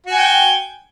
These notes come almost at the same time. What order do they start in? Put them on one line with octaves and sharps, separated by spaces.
F#4 G#5 G5